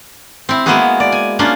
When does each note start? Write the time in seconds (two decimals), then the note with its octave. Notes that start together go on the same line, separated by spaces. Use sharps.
0.49 C4 E4
0.66 G#3 A#3 B3 E4 F#4 G#4
1.00 D5
1.12 G#5
1.39 A#3 C#4 D4 F4